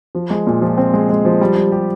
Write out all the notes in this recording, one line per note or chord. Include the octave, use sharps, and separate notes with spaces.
F3
G#3
A#2
F3
C4
G#3
G#3
F3
G3
G3
G4